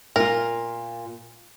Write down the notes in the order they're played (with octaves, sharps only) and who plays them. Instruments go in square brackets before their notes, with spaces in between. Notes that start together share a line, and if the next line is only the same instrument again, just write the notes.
[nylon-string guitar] A#2 F4 [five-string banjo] A#4